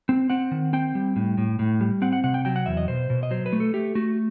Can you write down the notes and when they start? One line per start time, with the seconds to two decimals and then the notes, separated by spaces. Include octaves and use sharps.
0.09 C4
0.30 C4 F#5
0.51 D#3
0.73 C4 G5
0.95 G3
1.16 A2
1.38 A2
1.59 A2
1.81 G3
2.02 C4 F#5
2.13 F#5
2.24 C3 F#5
2.34 G5
2.45 F#3 G5
2.56 F#5
2.66 E2 E5
2.77 D#5
2.88 B2 C5
3.10 B2
3.23 D#5
3.31 F#3 C5
3.46 B4
3.53 A3
3.60 A4
3.74 A3 G4
3.95 A3 F#4